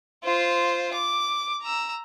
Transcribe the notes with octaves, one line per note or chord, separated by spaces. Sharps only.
F4 C5
D6
A#5 E6